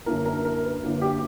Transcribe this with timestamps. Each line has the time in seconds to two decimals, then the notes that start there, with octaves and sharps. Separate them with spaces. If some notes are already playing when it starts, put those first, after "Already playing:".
0.06 F#2 D3 A#3 E4 A#4
0.26 A#4
0.45 A#4
0.63 B4
0.83 F#2 D3 A#3 E4
1.02 G4